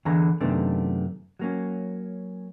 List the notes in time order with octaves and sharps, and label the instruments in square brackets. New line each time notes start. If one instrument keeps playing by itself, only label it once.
[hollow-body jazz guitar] E2 D3 E3 A#5
F#2 C3 D#3 A3 B3 D4
F#3 A#3 C#4